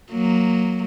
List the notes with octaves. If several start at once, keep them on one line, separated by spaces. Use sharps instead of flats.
F#3 A#3